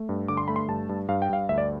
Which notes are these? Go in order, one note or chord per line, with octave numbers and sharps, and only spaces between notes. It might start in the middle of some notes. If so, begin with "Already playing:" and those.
Already playing: A3
G2
D3 D6
C6
A3 B5
C6
G2 A5
G2
G2 F5
G5
G2 F5
D2 E5
D5